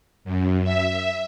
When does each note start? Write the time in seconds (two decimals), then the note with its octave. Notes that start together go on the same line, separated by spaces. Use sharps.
0.24 F#2
0.64 E5